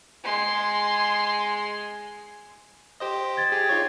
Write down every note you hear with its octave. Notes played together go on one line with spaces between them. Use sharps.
G#3 C6
G4 C5 D#5
G#6 A6
G4 G#4
D#4 F4 C#5